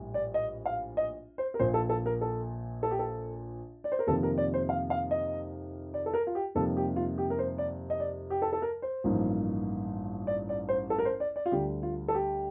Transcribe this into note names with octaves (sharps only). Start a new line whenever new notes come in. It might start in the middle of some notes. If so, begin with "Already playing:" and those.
Already playing: A#1 A2 G3
D5
D#5
F5
D#5
C5
A#4
A#1 A#2 F3 C5
A4
A4
A#4
A4
A4
G4
A4
D5
C5
A#4
F2 C3 D#3 A#3 A4
A#4
D5
C5
F5
F5
D#5
D5
A4
A#4
F4
G4
F2 C3 G3 A#3 D#4 A4
G4
F4
G4
A#4
C5
D5
D#5
D5
G4
A4
A4
A#4
C5
A1 G2 F3 A#3 D#4
D5
D5
C5
A4
A#4
C5
D5
D5
F4
D2 D3 G3 D4 G4
F4
A4
G4